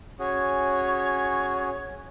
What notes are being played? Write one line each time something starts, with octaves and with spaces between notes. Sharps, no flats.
C#4 F#4 G#4 C#5